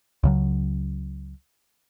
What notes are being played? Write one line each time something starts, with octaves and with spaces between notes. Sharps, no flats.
C#2 C#3 F#3